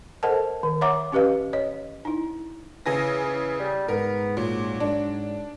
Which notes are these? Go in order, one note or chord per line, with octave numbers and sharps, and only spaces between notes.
A4 A#4 C5 D#5 F#5 A5
D#3
C#5 E5 F#5 A#5 D6
C#4 G4 B4 D#5 F5
C#5 D#5
D#4 E4
C#3 E3 G#5 A#6
E3
G3
G#2 B3 A#4
A#2 F#3
G#2 D4